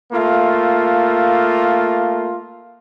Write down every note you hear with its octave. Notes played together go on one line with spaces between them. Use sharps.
A3 A#3 F4